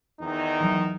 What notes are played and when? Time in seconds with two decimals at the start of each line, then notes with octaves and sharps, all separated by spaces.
0.21 E2 D#3 D#4
0.60 E3 F#3